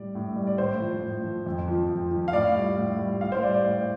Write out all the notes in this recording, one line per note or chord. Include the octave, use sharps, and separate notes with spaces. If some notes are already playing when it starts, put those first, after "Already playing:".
Already playing: A2 G3 D5
A2
G3
D5
A2 C5
F3
A2
F3
F2
F3
F2
F3
F5
A2 D5
G3
A2
G3
A2 F5
C5
G3 D5
D5
A2